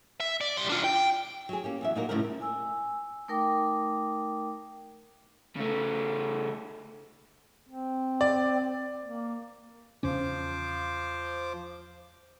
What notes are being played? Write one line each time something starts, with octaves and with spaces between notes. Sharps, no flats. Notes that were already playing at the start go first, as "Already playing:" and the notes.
E5
D5
G3 C6
D4 F4
G5
F#3 G#4
A#3 C#4 G4
E2 F#3 E5
A#2 F#3 D#4 F4 F#4 A#4
A2 C#3 F3 G3 C4 A#4
G#5 E6
A3 D#4 A#4 G5 D6
C#3 A3
C4
D5
A#3
E2 C#3 F3 C#4 C5 D6